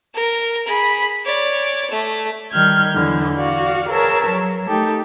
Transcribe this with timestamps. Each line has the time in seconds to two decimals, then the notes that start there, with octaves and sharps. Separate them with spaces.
0.14 A#4
0.66 G#4 B5
1.25 C#5 D5
1.90 A3
2.52 D#3 G3 F6 G6 G#6
2.94 E2 D3 E3 F#3
3.35 F#4 D5 F5
3.88 G#4 A#4 B4 C#5 A5 E6
4.27 F#3
4.67 A3 D#4 G4 A4